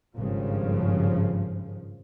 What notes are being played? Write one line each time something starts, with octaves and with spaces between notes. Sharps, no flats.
G#1 G2 C#3 F3